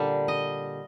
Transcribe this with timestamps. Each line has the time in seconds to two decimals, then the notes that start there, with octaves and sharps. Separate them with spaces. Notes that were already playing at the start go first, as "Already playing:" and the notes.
Already playing: A#2 D3 G3 A#4
0.28 D#5